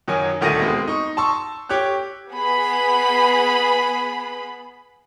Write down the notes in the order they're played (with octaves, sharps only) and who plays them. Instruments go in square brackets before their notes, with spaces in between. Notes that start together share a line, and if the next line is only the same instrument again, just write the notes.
[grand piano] F#2 D#3 F#3 G#5
D#1 D2 D#3 A3 A#6 D#7
B2 G#3 C4
D#4 C#6
A5 C6 C#6 E6
G4 C#5 C#6 F#6
[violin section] B3 G#4 B5